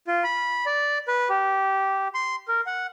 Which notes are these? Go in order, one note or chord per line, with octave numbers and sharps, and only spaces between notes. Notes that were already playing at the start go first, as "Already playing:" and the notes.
F4
B5
D5
B4
G4
C6
A#4
F#5